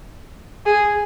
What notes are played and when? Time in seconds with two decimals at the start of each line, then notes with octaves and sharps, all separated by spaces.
0.66 G#4